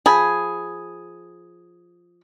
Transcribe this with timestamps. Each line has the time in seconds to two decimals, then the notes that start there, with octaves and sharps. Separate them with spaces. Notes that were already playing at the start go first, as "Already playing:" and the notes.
0.06 F3 G#4 B5